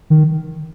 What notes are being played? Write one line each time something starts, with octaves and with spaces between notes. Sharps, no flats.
D#3